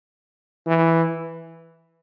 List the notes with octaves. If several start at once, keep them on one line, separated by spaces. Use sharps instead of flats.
E3